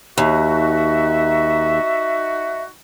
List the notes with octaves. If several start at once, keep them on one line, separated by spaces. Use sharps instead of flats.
D#2 D#4 F#4 E5